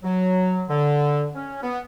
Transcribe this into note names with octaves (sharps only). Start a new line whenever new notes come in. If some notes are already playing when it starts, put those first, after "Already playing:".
F#3
D3
C#4
B3